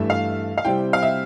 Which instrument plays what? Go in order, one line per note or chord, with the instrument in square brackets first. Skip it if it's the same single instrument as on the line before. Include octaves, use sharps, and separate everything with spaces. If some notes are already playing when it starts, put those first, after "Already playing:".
Already playing: [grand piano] G2 E3 A3 [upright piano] E5
[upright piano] F5
F5
[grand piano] C3 G3 C4 E4 [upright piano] G5
[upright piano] F5
E5